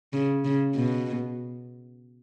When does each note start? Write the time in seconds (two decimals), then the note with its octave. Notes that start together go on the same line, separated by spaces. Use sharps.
0.13 C#3
0.45 C#3
0.75 B2